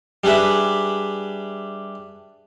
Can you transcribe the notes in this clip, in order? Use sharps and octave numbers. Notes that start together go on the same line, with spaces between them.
G3 D4 G#4 B4 E5